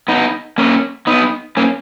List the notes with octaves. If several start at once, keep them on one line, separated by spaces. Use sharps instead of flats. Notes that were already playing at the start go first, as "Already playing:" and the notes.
B3 D#4
A#3 C#4
B3 D#4
A#3 C#4